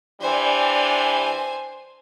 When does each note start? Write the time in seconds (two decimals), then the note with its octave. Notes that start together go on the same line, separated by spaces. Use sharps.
0.21 E3 G3 D4 C5 G#5